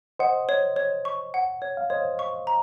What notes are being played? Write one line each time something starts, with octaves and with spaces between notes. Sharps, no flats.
C5 D#5 F#5
C#5
C#5
C#6
F#5
C#5
F5
C5 C#5 D#5
C#6
A#5